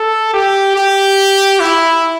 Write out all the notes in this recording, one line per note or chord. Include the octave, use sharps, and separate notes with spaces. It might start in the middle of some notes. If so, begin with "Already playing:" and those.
Already playing: A4
G4
G4
E4